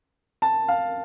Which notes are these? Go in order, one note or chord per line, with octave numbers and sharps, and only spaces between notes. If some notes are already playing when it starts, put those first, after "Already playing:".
A5
F5